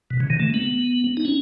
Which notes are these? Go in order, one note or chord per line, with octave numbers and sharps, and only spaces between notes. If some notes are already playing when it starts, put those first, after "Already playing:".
B2
C#3
D#3
A3
B3
D#4
C#4